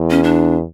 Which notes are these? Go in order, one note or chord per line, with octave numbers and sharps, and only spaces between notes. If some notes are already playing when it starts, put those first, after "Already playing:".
Already playing: E2
C#4
D4